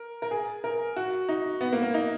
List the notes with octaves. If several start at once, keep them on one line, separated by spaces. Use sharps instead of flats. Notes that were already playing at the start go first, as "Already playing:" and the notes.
Already playing: A#4
A#4
G#4
A#4
F#4
D#4
B3
A#3
A#3
D#4